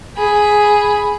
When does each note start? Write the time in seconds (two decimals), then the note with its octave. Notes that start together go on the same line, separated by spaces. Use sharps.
0.17 G#4 B5